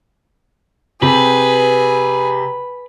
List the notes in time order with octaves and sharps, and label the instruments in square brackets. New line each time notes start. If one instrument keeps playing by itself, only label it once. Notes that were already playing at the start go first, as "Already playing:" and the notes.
[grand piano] C3 G4 [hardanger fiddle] G#4 [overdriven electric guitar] B4